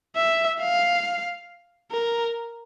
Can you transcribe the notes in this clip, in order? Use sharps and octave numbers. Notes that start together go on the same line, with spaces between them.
E5
F5
A#4